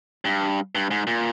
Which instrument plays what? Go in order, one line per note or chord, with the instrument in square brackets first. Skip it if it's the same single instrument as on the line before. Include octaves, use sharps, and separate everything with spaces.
[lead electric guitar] G2
G2
G#2
A#2